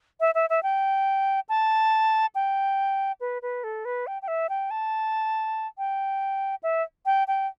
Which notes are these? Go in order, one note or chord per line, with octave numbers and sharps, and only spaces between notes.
E5
E5
E5
G5
A5
G5
B4
B4
A4
B4
G5
G5
E5
G5
A5
G5
E5
G5
G5